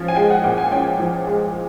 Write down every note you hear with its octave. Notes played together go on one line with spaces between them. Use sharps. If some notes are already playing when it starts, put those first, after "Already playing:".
Already playing: F3 C#4
G#5
G#3 G5
F#5
A#2 G5
G#5
C#4 G5
F3
G#3